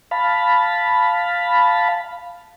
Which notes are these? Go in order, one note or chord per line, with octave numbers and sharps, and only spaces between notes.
F5 A5 B5